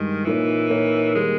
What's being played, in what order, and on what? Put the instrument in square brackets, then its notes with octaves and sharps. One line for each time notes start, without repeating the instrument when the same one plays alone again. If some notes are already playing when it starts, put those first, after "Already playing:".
Already playing: [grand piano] G2 G#3 [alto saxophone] D#3
[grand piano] A#2 A#3 D#4 A#4 C#5 [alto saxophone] E3
[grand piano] A#2 A#3 D#4 A#4 C#5
[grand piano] D#3 G3 A#3 [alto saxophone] G#3